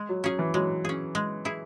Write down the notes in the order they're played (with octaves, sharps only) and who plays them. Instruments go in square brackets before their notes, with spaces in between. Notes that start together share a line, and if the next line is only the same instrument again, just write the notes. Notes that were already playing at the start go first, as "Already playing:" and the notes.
Already playing: [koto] G#3
[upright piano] F#3
[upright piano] F#3 [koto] C#4 G#4
[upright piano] E3
[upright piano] F#3 [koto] G#3
[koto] C#4 G#4
G#3
E4 G#4